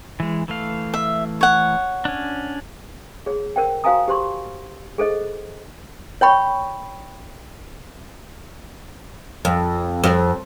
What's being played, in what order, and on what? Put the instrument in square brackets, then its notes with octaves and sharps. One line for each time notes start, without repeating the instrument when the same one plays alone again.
[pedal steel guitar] E3 G#3
E3 A3 F5
[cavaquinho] E5
C#5 F#5
[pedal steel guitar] C#4 D4
[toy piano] G#4 C#5
A#4 C5 F#5 G5
F#4 C5 F5 G#5 A#5 D#6
G4 C5 C6 C#6
G#4 A4 C5 D#5
C#5 G5 B5 C#6
[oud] F2
F2